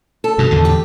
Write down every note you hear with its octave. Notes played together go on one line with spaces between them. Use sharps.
A4
G2 B2
E2 A2 D3
G4